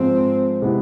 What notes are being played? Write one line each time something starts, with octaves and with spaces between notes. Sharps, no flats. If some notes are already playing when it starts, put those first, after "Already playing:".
Already playing: G#2 F3 G#3 C4
C3 G#3 B3 E4